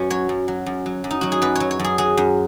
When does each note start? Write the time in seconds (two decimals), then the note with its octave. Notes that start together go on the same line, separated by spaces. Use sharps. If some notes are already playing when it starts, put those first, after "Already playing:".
Already playing: F#2 C#4 F#4 B4
0.10 F#3 C#5
0.29 F#2
0.48 F#3
0.66 F#2
0.86 F#3
1.04 F#2
1.11 D#4
1.21 F#3 F#4
1.32 G#4
1.42 F#2 B4
1.55 F#3 C#5
1.71 C#5
1.79 F#2
1.84 G#4
1.98 F#3 G#4
2.17 F#2